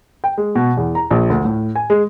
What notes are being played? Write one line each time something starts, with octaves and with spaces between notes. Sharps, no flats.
G5
G#3
B2
E2
A#5
A#1
D2
A2
G#5
G#3